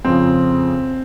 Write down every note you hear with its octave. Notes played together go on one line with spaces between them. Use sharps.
F2 C#3 F3 C4